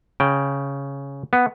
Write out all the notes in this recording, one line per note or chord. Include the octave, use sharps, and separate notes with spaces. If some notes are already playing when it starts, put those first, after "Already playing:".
C#3 G5
B3